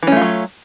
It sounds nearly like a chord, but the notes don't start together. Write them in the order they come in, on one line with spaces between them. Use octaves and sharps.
E3 C#4 A3 F4 F#3